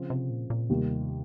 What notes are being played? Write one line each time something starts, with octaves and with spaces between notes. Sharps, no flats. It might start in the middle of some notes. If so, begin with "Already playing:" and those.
Already playing: C#3 F3 C4 F4
C3
A#2
A#2
D#2 C3 D#3 G3 A#3